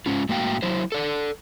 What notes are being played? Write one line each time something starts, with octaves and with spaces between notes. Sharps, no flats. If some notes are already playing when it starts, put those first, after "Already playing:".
G#2 G#3 C#4 F4
A2 G#3 A#3 F#4 F5 G5
F#3 E4 C5
A4 D5